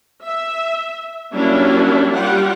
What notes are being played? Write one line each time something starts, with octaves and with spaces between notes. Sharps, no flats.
E5
F#3 G3 A#3 C#4 D4 E4
G3 F4 G4 F#5